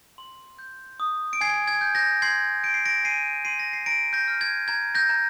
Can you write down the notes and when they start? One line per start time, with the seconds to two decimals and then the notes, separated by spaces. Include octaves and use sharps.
0.18 C6
0.59 G6
1.00 D#6
1.33 D7
1.41 G#5 G#6 C7
1.68 G#6
1.81 G6
1.95 G6 A#6
2.22 C6 G#6 C7
2.63 G6 D7
2.74 C7
2.86 A#6 D7
3.04 G#5 C7 D#7
3.45 C6 C7 D#7
3.59 A#6
3.73 C7
3.86 A#5 A#6 D7
4.13 G6 A#6
4.28 F6
4.41 G#6
4.68 A#5 G#6
4.95 G6 A#6
5.09 A#5